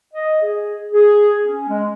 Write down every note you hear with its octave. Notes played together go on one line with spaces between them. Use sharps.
D#5
G#4
G#4
C#4
G#3